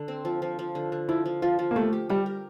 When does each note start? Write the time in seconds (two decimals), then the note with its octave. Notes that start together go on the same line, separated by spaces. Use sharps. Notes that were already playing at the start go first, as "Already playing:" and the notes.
Already playing: D3
0.08 C4
0.25 F3
0.42 F3
0.59 F3
0.75 D3
0.92 D3
1.08 F3 E4
1.26 F3
1.42 F3 F4
1.59 F3
1.71 A#3
1.76 A3 G4
1.93 G4
2.09 G3 G4
2.26 A#4